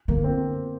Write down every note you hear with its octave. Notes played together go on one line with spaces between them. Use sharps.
D3 A#3
C4